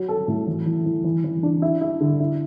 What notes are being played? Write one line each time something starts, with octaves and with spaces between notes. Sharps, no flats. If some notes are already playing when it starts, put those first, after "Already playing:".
Already playing: F#3
A4
A2
E3
E3
E3
E3
E3
D4
E4
E4
D3
E4